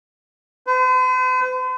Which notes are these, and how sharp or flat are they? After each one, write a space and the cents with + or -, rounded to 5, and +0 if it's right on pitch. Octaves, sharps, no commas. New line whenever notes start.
C5 -45